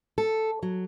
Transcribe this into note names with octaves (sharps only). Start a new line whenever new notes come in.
A4
F#3